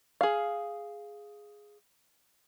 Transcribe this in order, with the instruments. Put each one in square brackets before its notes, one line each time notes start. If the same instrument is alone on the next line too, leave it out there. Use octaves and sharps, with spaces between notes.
[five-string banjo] G#4 F5